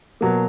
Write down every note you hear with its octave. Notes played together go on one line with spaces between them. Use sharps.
B2 F#3 A#3